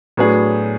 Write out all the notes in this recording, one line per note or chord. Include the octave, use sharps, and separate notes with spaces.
A2 F#3 B3 D4 G#4